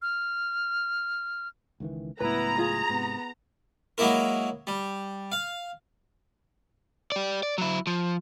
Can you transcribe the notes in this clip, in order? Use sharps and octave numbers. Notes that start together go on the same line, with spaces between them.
F6
C#2 D#3 E3
C#2 A2 F#3 B3 E4 B4 A#5
F4 G#4
G#2 C3 B3
F#3 G#3 A#3 E4 A#4
G3
F5
G4 D5
D5
F#3 E4
F3